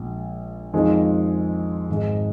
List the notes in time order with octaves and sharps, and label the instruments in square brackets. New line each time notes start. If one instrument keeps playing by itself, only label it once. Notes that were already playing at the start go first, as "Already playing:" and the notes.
Already playing: [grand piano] A#1 A#2 G#3
F2 D#3 G#3 C4 F4
G#1 G#2 D#3 G#3